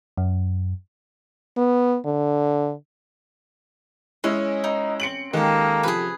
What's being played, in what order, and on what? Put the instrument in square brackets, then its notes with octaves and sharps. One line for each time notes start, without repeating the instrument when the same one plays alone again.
[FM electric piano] F#2
[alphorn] B3
D3
[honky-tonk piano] G#3 E4 D#5 [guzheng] C#4
[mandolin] D#4
[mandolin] A3 C4 [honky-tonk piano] C#7 D7 F#7
[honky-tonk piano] D#3 G#3 [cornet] A#3 [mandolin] G4 A4
[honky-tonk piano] C3 F3 [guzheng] G#4 B4